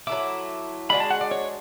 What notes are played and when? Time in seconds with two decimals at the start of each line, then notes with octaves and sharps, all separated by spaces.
0.07 F#3 A3 E4 D6
0.90 G#3 D4 F#4 B5
1.00 A5
1.10 F#5
1.21 D5
1.31 C#5